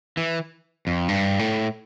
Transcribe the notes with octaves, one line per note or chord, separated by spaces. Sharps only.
E3
F2
G2
A2